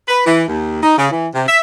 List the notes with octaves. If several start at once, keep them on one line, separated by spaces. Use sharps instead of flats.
B4
E3
D#2
D#4
C#3
E3
C3
E5